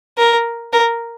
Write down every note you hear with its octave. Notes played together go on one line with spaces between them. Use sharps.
A#4
A#4